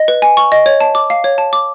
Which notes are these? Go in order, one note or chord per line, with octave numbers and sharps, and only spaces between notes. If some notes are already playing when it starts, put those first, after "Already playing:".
Already playing: D#5
B4
G#5
C#6
D#5
C#5
A5
D6
F5
C#5
A5
D6